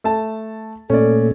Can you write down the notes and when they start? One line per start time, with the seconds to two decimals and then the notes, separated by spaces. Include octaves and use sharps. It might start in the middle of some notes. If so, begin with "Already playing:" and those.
0.04 A3 A5
0.90 A#2 A3 C#4 A4 D5